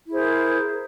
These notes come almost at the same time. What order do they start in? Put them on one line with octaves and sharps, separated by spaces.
E4 G#4 C5 A#4